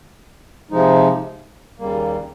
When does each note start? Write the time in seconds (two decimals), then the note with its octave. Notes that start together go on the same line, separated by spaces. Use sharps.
0.71 C3 F3 G#3 D#4
1.79 D#2 C#3 G3 A#3